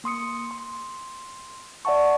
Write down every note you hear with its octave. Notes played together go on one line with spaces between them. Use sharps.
A#3 C6 D#6 C#7
C6
D5 E5 F#5 A5 C#6